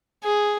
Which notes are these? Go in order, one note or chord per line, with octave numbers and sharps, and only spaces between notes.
G#4